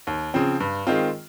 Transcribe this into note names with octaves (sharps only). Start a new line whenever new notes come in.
D#2
C#3 F3 C4
G2
D#3 G#3 C4 F4